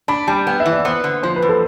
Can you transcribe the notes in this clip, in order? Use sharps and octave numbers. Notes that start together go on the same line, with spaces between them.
D4 B5
G3 A5
B3 G5
E5
E3
D5
B3 C5
D3
F3 C5
B4
E2
A4